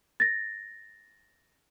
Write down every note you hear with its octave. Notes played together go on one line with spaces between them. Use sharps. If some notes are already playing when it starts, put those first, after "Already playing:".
A6 A#6